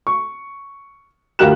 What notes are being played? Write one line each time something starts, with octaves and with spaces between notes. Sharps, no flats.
C#6
D2 F4 G4 A#4 F#6 E7